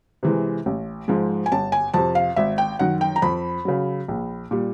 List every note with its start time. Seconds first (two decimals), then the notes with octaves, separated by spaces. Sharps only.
0.23 C3 E3 G#3
0.66 A1
1.08 G#2 F3 G#3
1.46 G#5
1.52 G1 A5
1.72 G#5
1.94 F2 C3 A5
2.15 F5
2.36 G#1 E5
2.58 G5
2.79 F#2 D#3 F#5
3.01 G5
3.16 A#5
3.22 F2 B5
3.65 C#3 F#3
4.08 A#1
4.51 A#2 G3